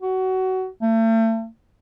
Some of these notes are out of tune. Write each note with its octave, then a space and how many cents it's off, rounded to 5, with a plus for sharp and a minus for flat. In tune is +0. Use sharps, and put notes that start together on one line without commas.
F#4 +20
A3 +40